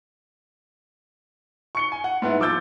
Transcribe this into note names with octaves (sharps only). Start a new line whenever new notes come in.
C#6 C#7 G7
G#5
F#5
G#2 B3 E4
F3 D6 E6 G6 A6